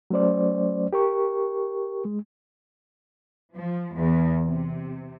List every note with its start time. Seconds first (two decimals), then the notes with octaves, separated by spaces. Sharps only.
0.10 F#3 A3 C#4 C5 D5
0.93 G4 A#4 C#6
2.05 G#3
3.54 F3
3.94 E2
4.42 C3